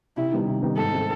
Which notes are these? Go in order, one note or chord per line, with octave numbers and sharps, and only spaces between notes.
C3 E4
D#3 G3 B3 D#4
C3
D#3 G3 B3 D#4
G#2 A4
D#3 G#3 C4